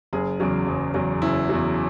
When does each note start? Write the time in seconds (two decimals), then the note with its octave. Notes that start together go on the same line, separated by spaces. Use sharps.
0.13 F#1 G#4
0.40 E2 C#3 F#3
0.67 F#1
0.94 E2 C#3 F#3
1.22 F#1 E4
1.49 E2 C#3 F#3